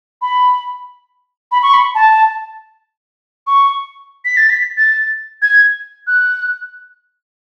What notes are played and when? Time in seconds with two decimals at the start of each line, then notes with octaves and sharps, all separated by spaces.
0.22 B5
1.52 B5
1.63 C#6
1.74 B5
1.95 A5
3.47 C#6
4.25 B6
4.37 A6
4.50 B6
4.77 A6
5.42 G#6
6.07 F#6